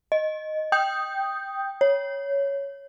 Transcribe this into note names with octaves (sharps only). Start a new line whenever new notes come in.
D#5
G5 D#6 G6
C#5